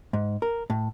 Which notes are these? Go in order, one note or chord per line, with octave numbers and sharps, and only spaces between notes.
G#2
A#4
A2